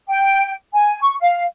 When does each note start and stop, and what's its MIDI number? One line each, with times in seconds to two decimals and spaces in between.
0.08 0.51 79
0.74 0.98 80
1.01 1.14 85
1.20 1.42 77